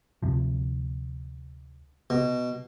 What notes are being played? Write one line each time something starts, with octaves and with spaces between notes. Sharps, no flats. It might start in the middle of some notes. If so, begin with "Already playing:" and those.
D2 C3 F3
B2